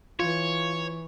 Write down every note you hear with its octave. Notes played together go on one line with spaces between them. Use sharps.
E3 F4 C#5